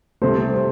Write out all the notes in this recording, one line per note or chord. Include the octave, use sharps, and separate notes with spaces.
C2 C3 A3 C5
C5